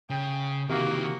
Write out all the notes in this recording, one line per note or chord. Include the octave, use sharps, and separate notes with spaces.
C#3 G5
C3 D#3 E3 A#3 F#4